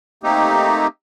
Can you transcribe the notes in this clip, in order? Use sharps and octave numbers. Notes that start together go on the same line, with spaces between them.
A3 A#3 C4 D#4 G4